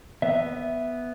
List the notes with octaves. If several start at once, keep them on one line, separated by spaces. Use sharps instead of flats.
B3 E5